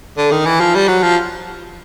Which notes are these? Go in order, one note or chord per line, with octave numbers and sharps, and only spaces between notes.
D3
D#3
E3
F3
G3
F#3
F3